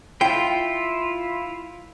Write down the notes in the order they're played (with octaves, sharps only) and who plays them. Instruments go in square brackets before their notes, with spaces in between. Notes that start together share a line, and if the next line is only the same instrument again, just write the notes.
[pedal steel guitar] E4 F4 [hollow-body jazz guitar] G5